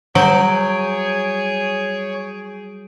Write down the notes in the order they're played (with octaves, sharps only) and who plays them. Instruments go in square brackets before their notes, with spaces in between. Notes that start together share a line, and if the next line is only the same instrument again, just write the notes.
[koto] F#3 [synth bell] G3 G6 D7 [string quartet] G#4 [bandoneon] C#5